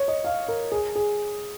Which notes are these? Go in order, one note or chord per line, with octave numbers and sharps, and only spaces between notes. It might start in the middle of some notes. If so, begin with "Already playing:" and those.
Already playing: C#5
D#5
F5
A#4
G#4
G#4